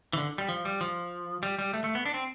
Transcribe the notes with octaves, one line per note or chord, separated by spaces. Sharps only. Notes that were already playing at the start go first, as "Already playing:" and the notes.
E3
D3
G3
F3
G3
F3
G3
G3
A3
A3
B3
D4
C4